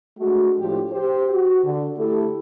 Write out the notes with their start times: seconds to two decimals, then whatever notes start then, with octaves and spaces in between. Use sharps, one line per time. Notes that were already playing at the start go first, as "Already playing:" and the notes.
0.18 G#3 A3 D4 F#4
0.58 A2 F3 D4 G4
0.90 G4 C5
1.30 F#4
1.64 D3
1.97 A3 E4 G4 A4